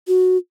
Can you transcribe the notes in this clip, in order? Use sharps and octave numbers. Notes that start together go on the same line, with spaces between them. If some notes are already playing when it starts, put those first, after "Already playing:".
F#4